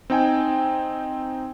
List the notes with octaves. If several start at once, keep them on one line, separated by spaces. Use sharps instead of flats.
C4 D#4 G5 G#5